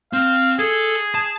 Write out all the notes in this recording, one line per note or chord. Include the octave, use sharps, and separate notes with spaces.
C4 F5
G#4 A4
A5